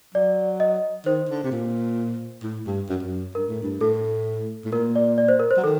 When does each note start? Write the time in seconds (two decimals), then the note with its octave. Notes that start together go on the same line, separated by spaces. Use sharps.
0.15 F#3 D5
0.60 D#5
1.06 D#3 C5
1.29 D3
1.44 C3
1.51 A#2
2.43 A2
2.67 G2
2.89 F#2
3.03 F#2
3.35 G2 A#4
3.48 A2
3.62 G2
3.81 A2 A4
4.65 A2
4.72 A#2 A#4
4.96 D5
5.18 D5
5.28 C5
5.40 A#4
5.51 C5
5.57 F#3
5.64 D#3 A4